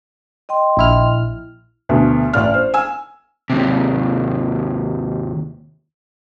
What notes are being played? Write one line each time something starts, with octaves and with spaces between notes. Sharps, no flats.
D#5 G5 C6
A#1 E4 F6
D2 B2
A1 D5 F6
C5
G#5 E6
D#2 C3